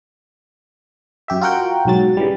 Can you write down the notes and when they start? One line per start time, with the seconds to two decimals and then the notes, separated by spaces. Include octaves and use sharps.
1.28 F#2 G4 E5
1.41 F4 F#4 A#4 F#5 G5
1.85 B1 G#2 F#3 A6
2.17 C#3 E3 G3